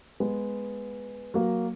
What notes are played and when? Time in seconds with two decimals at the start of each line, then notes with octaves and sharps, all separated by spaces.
0.20 G#3 B3
1.34 F#3 A#3